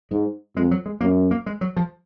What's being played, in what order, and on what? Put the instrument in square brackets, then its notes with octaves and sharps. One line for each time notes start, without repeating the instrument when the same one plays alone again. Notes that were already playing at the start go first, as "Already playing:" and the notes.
[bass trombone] G#2 [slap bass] G#3
[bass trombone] F2 [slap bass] G#3
[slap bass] F#3
G#3
[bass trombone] F#2 [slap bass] A#3
[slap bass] A#3
G#3
F#3
F3